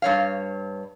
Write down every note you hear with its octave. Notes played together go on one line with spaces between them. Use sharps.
G2 C#5 F5